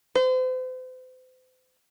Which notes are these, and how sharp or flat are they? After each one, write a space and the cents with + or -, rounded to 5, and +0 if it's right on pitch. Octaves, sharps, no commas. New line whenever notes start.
C5 -40